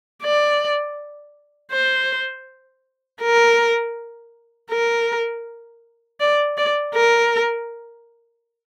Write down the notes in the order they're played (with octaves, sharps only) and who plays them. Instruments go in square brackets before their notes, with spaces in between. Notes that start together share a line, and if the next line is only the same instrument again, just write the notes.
[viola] D5
C5
A#4
A#4
D5
D5
A#4